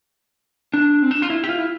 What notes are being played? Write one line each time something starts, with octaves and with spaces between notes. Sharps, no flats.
D4
C4
D4
F4
E4
G4
F4
E4